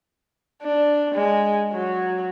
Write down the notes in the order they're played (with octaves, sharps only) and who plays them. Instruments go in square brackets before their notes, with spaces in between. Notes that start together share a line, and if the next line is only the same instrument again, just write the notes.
[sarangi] D4
G#3
F#3